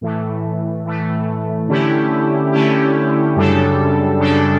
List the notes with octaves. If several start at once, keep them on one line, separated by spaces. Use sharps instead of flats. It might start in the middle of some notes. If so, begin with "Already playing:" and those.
A2 E3 A3
A2 E3 A3
D3 A3 C#4 E4 G4
D3 A3 C#4 E4 G4
F#2 C#3 G3 D4 A4
F#2 C#3 G3 D4 A4